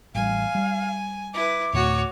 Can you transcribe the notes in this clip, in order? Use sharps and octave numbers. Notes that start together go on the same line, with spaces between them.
A1 G3 F5 G#5
G3
E4 B4 D6
D2 A2 D3 F#4 C#5